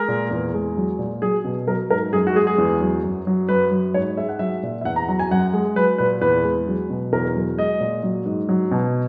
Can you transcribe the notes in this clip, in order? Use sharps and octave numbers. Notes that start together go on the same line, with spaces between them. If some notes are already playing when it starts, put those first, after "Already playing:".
Already playing: G#3 A#4
A#2
E2
G#3
F#3
A#2
F#3 G#4
B2
F#3 A#4
G#2 A#4
F#2 G#4
F#4
G#3 G#4
G#4
E2
F#3
F#2
F#3
F#2 B4
F#3
G#2 C#5
G#3 E5
F#5
F#3 E5
A#2
E5
E2 F#5
A#5
F#3 A#5
G#5
F#2 F#5
G#3
F#3 B4
A#2 B4
E2 B4
G#3
F#3
B2
E2 A#4
F#3
G#3 D#5
A#2
F#3
G#2
F#3
B2